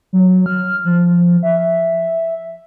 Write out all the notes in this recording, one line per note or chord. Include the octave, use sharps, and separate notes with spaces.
F#3
F6
F3
E5